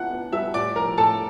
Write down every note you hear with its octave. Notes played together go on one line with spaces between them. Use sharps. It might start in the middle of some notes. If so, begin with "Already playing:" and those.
Already playing: B3 E4 F#5 F#6
B3
G3 E5 E6
A2 D5 D6
F3 A#4 A#5
A2 A4 A5